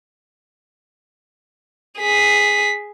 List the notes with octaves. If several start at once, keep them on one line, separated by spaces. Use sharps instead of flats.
G#4 B6